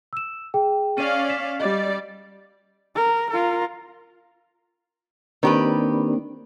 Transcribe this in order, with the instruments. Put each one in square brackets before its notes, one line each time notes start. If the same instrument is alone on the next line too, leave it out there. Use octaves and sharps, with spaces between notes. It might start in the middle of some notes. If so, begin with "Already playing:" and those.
[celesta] E6 E7
G#4 G5
[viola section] C#4 D5 F5 [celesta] D#7
[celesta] B6 E7
[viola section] G3 D5 [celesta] D#5
[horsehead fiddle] A#4
F4 A#4
[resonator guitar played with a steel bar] D#3 G4 B4 [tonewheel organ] A#3 C4 D4